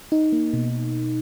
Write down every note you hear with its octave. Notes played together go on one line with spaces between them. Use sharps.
D#4
A#3
B2